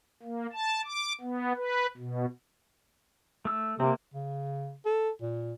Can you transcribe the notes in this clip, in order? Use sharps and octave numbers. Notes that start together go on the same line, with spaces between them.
A#3
A5
D6
B3
B4
B2
A3 E6
C3 A#3 C4
C#3
A4
A#2